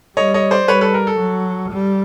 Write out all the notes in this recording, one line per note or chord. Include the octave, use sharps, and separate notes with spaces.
G3 C#5 D#5
C#5 D#5
C5 D5
G3 B4 C#5
A4 B4
A#4
A4
F#3
G3